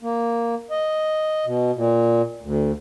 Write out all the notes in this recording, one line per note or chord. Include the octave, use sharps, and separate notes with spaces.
A#3
D#5
B2
A#2
D2